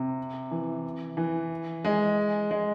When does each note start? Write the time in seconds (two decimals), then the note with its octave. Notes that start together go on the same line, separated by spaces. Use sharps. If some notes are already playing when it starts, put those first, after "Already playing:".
Already playing: C3
0.51 E3
1.17 E3
1.85 G#3
2.51 G#3